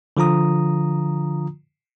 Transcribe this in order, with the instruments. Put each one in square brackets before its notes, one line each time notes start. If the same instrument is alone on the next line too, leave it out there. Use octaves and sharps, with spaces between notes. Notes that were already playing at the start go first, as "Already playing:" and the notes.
[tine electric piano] D3 F3 F4 A#5 D#6